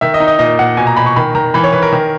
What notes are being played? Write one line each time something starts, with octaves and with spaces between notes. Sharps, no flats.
D#3 E5
D#5
D#4
D#5
A#2 D#5
A#2 F#5
B2 G#5
A#5
B2 B5
C#6
D#3 B5
D#3 A#5
E3 B5
C#5
E3 B4
A#4
D#3